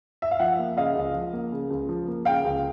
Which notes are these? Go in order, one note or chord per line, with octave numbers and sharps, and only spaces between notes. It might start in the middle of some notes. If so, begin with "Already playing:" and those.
E5
F5
F3 E5 F#5
A#3
C#3 D#5 F5
C#2
F3
A#3
C#3
C#2
F3
A#3
C#3 F5 G5
C#2